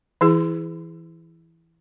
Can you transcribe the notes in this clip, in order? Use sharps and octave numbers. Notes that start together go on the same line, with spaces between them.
E3 E4 G#4